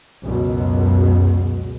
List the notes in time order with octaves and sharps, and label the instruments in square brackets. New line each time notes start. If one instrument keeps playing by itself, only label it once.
[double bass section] C#2 F#2 B2